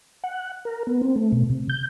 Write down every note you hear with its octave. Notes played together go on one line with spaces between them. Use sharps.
F#5
A#4
B3
C4
A3
B2
C3
G6